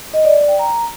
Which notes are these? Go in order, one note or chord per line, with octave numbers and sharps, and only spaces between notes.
D#5
D5
D5
G5
A#5